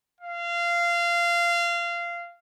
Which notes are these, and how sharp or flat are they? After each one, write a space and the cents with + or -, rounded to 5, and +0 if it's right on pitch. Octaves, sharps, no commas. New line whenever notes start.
F5 -20